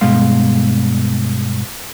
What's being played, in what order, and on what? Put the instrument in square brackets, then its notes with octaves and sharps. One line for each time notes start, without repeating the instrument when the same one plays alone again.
[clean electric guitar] G2 B2 G#3 F5 C6